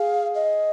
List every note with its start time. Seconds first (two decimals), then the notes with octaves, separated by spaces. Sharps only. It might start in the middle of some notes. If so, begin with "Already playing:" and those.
Already playing: G#4 F5
0.35 D#5